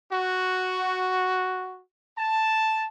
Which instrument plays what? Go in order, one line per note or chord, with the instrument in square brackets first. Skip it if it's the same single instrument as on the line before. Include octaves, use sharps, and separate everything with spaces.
[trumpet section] F#4
A5